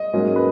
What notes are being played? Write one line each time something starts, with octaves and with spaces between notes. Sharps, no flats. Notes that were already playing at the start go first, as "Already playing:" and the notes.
Already playing: D#5
G#2 F#3 A#3 C#4
B4